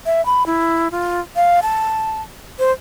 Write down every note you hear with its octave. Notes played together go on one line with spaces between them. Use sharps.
E5
B5
E4
F4
F5
A5
C5